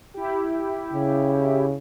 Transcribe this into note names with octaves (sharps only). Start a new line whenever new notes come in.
E4 G4
C#3